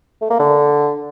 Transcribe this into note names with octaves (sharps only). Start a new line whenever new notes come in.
A3
A#3
D3